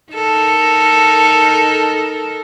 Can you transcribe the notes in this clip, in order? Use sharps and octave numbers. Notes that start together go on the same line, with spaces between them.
D#4 A4 A#4